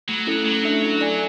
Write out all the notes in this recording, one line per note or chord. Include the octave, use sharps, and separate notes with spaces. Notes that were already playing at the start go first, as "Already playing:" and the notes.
F#3 A3
C#4 E4 A4
F#3 A3
D4 A4 E5
E4
A4 D5 G#5